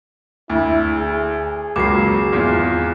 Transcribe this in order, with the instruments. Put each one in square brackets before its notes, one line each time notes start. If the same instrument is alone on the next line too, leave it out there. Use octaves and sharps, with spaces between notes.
[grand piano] D2 [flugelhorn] E4
[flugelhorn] G#4
[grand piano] C#2 F#3 A#3 [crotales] D6 C7
[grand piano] G#1 E2 F4